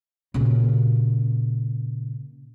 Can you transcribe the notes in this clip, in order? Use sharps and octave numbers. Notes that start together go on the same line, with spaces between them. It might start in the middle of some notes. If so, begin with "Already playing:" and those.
A#2 C#3